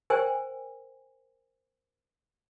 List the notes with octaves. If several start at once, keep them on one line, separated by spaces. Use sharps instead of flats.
A#4 C5 G5 G#5